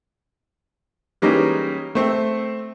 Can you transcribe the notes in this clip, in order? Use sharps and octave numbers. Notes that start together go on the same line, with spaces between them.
E3 G3 G#3 A#3 C#4 D#4
A3 C4